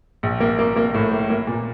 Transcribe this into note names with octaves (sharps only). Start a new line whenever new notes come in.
A#1
A#3
A#3
A#3
A2
A#3
A#3
A#2